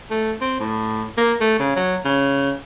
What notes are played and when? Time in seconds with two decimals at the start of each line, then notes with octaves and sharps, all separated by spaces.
0.11 A3
0.42 C4
0.60 A2
1.18 A#3
1.41 A3
1.59 C#3
1.76 F#3
2.05 C#3